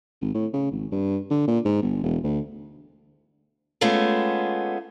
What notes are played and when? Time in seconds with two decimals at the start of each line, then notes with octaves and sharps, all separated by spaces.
0.22 G#1
0.35 A2
0.54 C#3
0.72 G#1
0.92 G2
1.30 D3
1.48 A#2
1.65 G#2
1.82 G1
2.03 E1
2.24 D2
3.81 G#3 A3 B3 C#4 F4